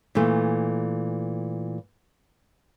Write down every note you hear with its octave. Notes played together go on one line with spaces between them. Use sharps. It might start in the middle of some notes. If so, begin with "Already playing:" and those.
A#2 E3 A3